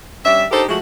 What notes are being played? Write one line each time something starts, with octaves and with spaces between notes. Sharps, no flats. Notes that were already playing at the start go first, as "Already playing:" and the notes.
G3 C#4 D4 E5
D4 D#4 G4 A4 A#4 C5
F3 G#3 A3 F#4